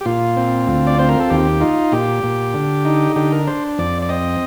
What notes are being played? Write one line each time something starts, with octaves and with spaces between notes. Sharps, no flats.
G4
A#2 F4
C4
D2
D5
C4 C5
A#4
A4
D#2 G4
D#4 F4
A#2 G4
A#2
D3
D#4
D3 G4
A#4
D4 C5
F2 D5
D5
C4 D#5